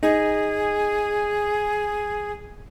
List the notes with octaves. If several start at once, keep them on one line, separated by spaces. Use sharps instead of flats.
D#4 G#4